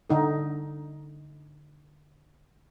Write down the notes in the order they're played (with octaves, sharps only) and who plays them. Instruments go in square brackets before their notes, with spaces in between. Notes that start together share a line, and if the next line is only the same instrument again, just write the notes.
[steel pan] D3 D#4 A4